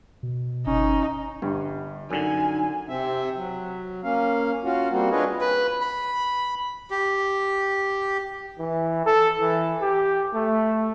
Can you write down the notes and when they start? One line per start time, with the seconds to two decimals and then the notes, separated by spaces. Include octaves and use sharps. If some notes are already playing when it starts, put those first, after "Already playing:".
0.23 B2
0.67 G1 C#4 D#4
1.42 G1 G2
2.11 F#2 D3 D#4 G#5
2.89 C3 C4 E5
3.36 F#3
4.04 A#3 C#4 F5
4.64 C#4 F4 F#4
4.91 G3 A#3 C4 F#4
5.11 D4 F4 G#4 B4 C#5 D#5
5.40 B4
5.81 B5
6.90 G4
8.59 E3
9.06 A4
9.41 E3
9.81 G4
10.34 A3